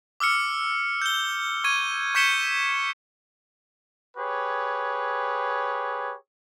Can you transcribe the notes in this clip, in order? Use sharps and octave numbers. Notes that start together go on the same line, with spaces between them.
D6 E6 F6 C#7
G6 G7
C#6 G#6 D#7
C#6 G6 B6 C#7 E7 G7
G4 G#4 B4 C#5